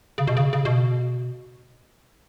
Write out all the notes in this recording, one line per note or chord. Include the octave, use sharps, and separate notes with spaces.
C#3
B2
C#3
C#3
B2